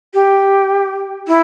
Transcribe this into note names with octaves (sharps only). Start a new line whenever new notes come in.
G4
E4